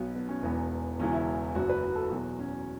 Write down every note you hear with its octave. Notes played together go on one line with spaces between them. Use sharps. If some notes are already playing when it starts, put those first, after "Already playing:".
Already playing: B1 B2 F#3 B3
B3
C#4
E1 E2 E3 B3
E1 E2 C#3 E3 C#4
E4
F#1 F#2 F#3 F#4
B4
F#4
A4
E2 B2 F#3 F#4
C#4